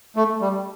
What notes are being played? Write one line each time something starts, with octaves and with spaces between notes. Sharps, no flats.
A3
G3